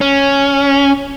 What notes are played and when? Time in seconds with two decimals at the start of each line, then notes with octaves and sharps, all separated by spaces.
0.01 C#4